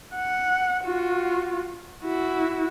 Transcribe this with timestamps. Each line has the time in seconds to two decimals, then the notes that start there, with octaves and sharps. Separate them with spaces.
0.15 F#5
0.84 F4 F#4
2.04 E4 F#4